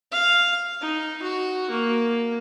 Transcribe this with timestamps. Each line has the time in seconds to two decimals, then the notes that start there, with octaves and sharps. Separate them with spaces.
0.11 F5
0.81 D#4
1.22 F#4
1.70 A#3